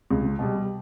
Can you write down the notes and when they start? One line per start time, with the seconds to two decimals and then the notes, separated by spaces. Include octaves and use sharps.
0.11 C#2
0.39 B2 G3